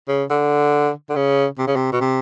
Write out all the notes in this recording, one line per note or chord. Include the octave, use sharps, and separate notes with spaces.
C#3
D3
D3
C#3
C3
C#3
C3
B2
C3